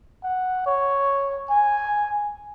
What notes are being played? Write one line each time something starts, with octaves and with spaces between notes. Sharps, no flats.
F#5
C#5
G#5